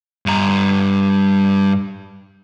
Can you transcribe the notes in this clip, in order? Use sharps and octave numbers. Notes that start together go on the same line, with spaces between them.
G2 A#5